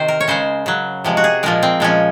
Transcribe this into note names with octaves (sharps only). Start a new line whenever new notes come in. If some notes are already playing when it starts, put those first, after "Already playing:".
Already playing: C3 D#3 C5
A#4
C#5
C#3 G#3 C5
C#3 F#3
C3 F3 G#3
F#4
G#4
A#2 F3 G#3 A#4
C4
A#2 F3 G#3 C#4